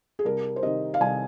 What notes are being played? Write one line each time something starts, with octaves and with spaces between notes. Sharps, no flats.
G#4
C2 A#4
C5
C3 D#3 D#5
F5
C2 G#5